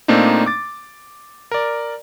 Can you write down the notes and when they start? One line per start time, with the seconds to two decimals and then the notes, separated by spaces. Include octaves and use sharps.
0.08 A#2 A3 A#3 C4 D4 D#4
0.46 D6 A6
1.52 A#4 D5